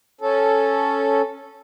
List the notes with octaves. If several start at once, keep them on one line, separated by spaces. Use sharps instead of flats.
C#4 A4